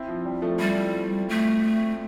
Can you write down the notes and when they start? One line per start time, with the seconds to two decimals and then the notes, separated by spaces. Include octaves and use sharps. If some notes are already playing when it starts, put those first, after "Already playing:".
Already playing: C4 E4
0.08 F3
0.25 G3
0.42 F3 A3
0.59 G3 E4 G4
1.29 A3